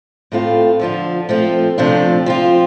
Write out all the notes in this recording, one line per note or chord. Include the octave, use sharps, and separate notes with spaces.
A2 A3 C4 F4
D3 F3 D4 F4
F3 A3 C4 F4
C3 F3 A3 D4 F4
F3 C4 F4